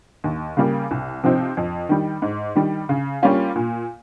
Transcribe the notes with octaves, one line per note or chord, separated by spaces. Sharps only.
D#2
C#3 G3 A#3
C2
C3 F3 C4 D#4
F2
D#3 G3
G#2
D#3 G3
C#3
G3 A#3 C#4 F4
A#2